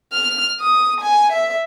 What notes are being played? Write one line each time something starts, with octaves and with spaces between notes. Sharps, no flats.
F6
D#6
G#5
E5